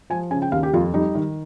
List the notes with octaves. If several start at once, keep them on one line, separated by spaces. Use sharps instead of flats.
F3 G#5
C#3 G#5
G5
D#2 F5
G4
F2 F4
G3 D#4
D#3